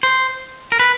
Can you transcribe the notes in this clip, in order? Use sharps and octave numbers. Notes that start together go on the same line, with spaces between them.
C5
A#4
B4